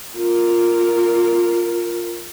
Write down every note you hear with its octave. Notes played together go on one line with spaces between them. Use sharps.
F4 A#4